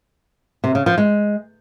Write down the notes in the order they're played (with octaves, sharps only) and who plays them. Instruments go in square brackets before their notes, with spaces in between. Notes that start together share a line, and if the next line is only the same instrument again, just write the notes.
[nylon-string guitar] C3
C#3
F3
G#3